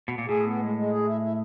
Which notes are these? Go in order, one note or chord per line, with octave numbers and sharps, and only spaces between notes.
B2
A#2
A2 G#4
B3
G#3
G#3
G#4
E4
E4